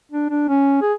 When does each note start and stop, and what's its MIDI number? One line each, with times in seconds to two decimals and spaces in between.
0.12 0.29 62
0.30 0.43 62
0.49 0.78 61
0.81 0.93 68